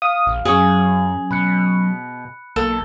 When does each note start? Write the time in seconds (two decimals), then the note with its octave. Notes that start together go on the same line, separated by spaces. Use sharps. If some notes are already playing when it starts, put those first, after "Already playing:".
0.02 F5 D#6
0.27 A#1
0.45 F#2 F#3 C#4 G#4
1.31 B2 B5 F#6 C#7
2.56 B1 A#3 A4